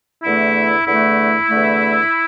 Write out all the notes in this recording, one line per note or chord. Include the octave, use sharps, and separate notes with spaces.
E2 D3 A3 E4
E2 D3 A3 E4
E2 D3 A3